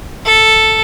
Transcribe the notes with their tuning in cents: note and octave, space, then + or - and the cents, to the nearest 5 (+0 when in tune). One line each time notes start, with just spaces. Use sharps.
A4 +0